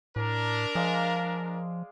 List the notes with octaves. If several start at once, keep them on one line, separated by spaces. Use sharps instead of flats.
A2 D4 A#4
F3 G#3 D5 F5